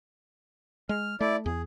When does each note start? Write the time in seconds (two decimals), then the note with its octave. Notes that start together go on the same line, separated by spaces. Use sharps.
0.89 G#3 F6
1.21 A3 E4 D5
1.46 E2 G#4